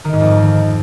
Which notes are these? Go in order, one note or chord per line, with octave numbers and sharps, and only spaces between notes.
D#3
G#2
F2